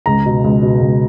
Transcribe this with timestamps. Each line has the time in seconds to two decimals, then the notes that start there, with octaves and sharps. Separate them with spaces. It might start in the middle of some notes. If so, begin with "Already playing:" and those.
0.06 C#2 A#5
0.26 B2
0.44 C#2
0.62 B2
0.81 C#2